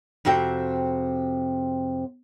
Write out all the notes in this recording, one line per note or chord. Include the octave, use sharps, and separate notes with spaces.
F2 C3 F#4 E5 G5